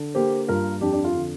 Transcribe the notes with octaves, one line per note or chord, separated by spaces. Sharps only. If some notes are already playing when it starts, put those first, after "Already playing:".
Already playing: D3
A#3 G4 C5
G2 F4 A#4
F2 D4 G4
D4
F4
D3